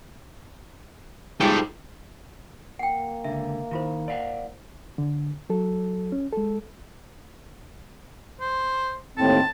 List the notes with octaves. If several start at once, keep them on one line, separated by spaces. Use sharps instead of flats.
G#2 F3 G3 A4 G5
A#3 F#5 G5
C#2 D3 E5
D#3 E4 F4 C5
D5 F5 F#5
D3
F#3 A4
C#4
G#3 A4
C5
D#2 A2 C4 A5